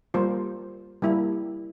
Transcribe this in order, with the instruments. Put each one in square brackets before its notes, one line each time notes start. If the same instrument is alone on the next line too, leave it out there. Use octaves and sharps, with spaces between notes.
[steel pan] G3 A#3 F4 C5
G3 A#3 E4